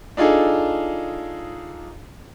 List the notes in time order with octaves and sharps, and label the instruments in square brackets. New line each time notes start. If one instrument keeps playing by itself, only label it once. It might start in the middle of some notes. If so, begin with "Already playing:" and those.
[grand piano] D4 D#4 F4 G#4 A4